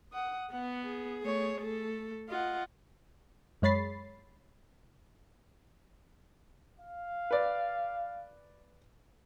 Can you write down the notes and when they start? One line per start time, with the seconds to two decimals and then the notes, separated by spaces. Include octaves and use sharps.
0.13 F#5 D#6
0.52 B3 F#5
0.86 G#4
1.23 A3 C#5
1.60 A3 A4
2.29 F4 D#5 F#5
3.62 F#2 G#3 C#5 B5 A6 C7
6.80 F5
7.31 B4 D5